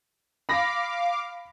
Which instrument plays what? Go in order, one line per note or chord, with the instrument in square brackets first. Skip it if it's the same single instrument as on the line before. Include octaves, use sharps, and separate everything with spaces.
[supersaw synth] F5 D6 [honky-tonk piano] B5 A#6